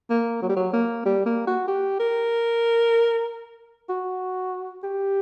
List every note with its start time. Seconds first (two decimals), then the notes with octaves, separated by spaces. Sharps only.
0.10 A#3
0.42 F#3
0.49 G3
0.56 F#3
0.73 A#3
1.05 G3
1.26 A#3
1.47 F#4
1.68 G4
1.99 A#4
3.89 F#4
4.83 G4